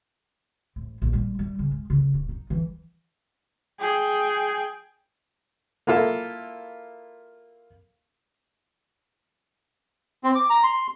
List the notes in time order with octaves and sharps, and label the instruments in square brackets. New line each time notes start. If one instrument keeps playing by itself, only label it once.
[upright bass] A1
A#1
G3
G3
C#3
G#3
C#3
D#1
D#4
E3
[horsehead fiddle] G#4 G5
[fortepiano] A#3 E4 F4 A4
[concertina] C4
D6
A#5
C6